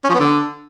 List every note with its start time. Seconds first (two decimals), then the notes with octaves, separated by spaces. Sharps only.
0.04 C#4
0.09 F3
0.14 B3
0.20 D3